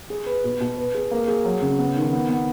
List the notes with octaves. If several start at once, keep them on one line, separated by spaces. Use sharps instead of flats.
G#4
B4
B2
B2
B4
G#4
A#3
G#4
F#3
C#3
B3
D#3
B3
B3